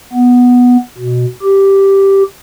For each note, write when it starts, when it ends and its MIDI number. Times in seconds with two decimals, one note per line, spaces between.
0.13 0.77 59
0.98 1.25 47
1.43 2.23 67